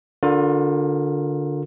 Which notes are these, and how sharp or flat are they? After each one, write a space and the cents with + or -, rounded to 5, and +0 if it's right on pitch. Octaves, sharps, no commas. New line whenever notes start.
D3 -10 F4 +35 A#4 +0